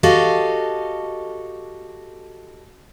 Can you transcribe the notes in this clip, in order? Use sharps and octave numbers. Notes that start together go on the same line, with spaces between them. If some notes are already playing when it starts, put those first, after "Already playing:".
F#4 G4 A4 D#5 F5